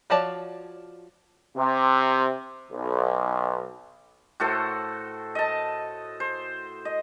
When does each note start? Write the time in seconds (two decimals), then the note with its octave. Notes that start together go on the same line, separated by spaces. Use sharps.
0.10 F3 F#4 C#5 D5 A5
1.56 C3
2.72 B1
4.40 A2 F#4 A4 C5
5.35 D#5 A5
6.20 C5
6.85 D#5